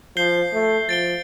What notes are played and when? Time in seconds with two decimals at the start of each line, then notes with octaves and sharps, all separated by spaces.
0.16 F3 G6 C7 G7
0.53 A3
0.89 F3 A6 D7 G7